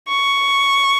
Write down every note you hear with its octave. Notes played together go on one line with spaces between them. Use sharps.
C#6